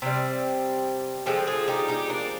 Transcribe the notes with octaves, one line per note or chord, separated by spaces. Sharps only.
C3 G3 C4
D3 F3 G#3 C4
F4 G#4
D#4 G4
D#4 G4
A#3 D4